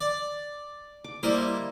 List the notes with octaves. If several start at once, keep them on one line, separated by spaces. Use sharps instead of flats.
D5
D6
G3 A#3 E4 C5 D#5